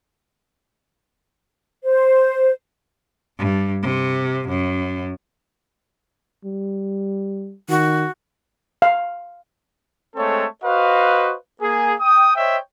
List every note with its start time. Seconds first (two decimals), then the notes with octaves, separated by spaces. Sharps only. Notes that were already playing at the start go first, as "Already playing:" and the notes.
1.83 C5
3.39 G2
3.83 C3
4.49 F#2
6.44 G3
7.69 D#3 F#4
8.82 F5
10.15 G#3 A3 C4 A4 C#5
10.64 F#4 B4 C5 D#5 F5
11.61 A#3 G#4
12.00 G5 D#6
12.36 C5 C#5 D#5 E5 G5